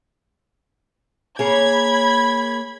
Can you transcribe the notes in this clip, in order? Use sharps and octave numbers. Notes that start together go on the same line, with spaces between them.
A#3 G#4 C#5 B5 G#6